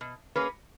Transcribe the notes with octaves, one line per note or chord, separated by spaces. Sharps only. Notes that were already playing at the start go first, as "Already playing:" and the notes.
B2
A#3 C#4 G#4 B4